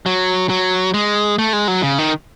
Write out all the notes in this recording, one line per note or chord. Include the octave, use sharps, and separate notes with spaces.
F#3
F#3
G#3
A3
G#3
F#3
C#3
D#3